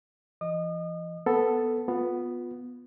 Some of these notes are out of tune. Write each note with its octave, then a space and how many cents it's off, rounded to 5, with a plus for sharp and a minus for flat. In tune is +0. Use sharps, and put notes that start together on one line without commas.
E3 +45 D#5 -10 D#6 -40
B3 +0 A4 +0
B3 +0 F4 +25